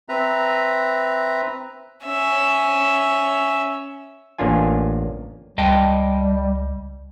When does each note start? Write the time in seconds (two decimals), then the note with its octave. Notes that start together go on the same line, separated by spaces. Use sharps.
0.09 C4 B4 E5 A#5
2.05 C#4 E5
4.38 A1 A#3 C#4 D4 F4 G#5
5.58 C#2 G3 D#5 G5 A5